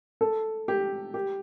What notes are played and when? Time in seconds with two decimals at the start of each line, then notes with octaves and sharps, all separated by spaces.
0.21 A4
0.68 G4
1.14 G4